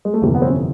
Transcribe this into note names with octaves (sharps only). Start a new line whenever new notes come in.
G#3
A3
G1 F2 C3 E3 A#3
B3
C4
C#4